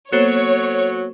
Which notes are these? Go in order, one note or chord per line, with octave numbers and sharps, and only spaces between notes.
F#3 A#3 B3 F#4 A4 C5 C#5